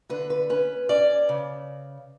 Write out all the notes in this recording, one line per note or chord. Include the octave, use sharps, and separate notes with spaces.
D3 B4
B4
C#4 B4
C#4 D5
C#3